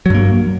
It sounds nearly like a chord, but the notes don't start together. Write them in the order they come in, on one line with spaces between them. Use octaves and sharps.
F#3 G2 A#3